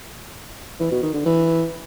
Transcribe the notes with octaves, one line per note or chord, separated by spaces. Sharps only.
E3
B2
D#3
D3
E3